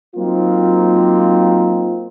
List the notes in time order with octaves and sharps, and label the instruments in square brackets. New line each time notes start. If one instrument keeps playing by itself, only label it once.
[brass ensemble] F#3 A#3 C4 D#4 F4